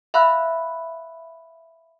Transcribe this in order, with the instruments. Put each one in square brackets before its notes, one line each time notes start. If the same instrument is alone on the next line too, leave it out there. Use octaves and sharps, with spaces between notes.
[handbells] E5 F5 B5 E6 F#6